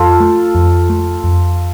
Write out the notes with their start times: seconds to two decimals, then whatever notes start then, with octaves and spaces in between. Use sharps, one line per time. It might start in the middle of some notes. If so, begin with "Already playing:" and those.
Already playing: F2 F4 A4
0.20 A3
0.55 F2
0.90 A3
1.24 F2